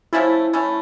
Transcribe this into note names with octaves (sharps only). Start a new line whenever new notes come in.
F3 A3 C#4 E4 F4
A3 C#4 E4